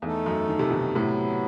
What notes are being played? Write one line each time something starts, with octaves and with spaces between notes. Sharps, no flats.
E2 A3 D#4 A4
F#2
D#3
C3
B2 D#3
A2 C3 F#3 B3 E4